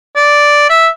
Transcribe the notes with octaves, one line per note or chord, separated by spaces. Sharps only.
D5
E5